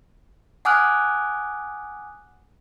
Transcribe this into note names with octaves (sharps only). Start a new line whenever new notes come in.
F#5 G#5 D6 D#6 F6 F#6